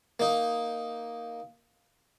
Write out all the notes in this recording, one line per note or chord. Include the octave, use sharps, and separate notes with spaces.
A#3 D#4